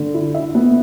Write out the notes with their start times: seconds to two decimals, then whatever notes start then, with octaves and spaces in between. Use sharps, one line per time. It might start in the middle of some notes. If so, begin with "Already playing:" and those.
Already playing: D3
0.14 E4
0.34 E5
0.55 B3